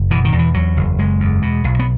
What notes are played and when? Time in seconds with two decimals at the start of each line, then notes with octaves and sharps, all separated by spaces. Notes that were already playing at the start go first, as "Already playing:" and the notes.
Already playing: F#1
0.10 B2 E3
0.25 D#3
0.33 E2
0.39 E3
0.54 E2 F#3
0.77 F#1
0.98 F#1 G#3
1.20 E2
1.42 B2
1.64 B1
1.80 B3